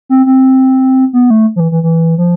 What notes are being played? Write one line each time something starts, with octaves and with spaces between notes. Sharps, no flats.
C4
C4
B3
A3
F3
E3
E3
E3
F3